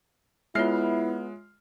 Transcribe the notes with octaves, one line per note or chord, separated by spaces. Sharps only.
G#3 B3 E4 F4 C#5 E5 F6 C7